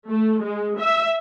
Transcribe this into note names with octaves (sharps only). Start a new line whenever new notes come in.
A3
G#3
E5